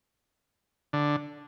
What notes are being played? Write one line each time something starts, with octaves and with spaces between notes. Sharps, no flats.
D3